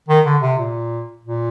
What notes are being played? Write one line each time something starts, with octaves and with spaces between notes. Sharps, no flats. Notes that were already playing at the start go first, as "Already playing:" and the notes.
D#3
D3
C3
A#2
A#2